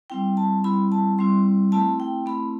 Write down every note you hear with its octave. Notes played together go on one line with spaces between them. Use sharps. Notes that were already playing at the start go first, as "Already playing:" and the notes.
G3 C4 E4 G5
A5
G3 C4 E4 B5
A5
G3 C4 E4 C6
A3 C4 E4 A5
G5
A3 C4 E4 B5